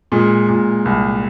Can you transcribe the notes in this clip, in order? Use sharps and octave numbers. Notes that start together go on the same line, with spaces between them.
A#2 G#3
A#2
C2